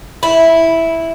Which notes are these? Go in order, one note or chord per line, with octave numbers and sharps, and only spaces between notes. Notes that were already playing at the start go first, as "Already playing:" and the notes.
E4